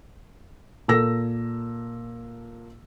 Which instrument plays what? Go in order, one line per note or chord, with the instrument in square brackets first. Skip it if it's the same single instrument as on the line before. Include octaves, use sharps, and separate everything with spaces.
[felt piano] A#2 A4 A#4 E6 A#6